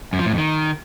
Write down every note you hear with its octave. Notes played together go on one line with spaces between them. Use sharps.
F#2
F3
A2
F2
D#3